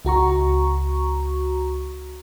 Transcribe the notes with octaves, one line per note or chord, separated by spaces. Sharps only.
C#2 F#4 A#5 C#6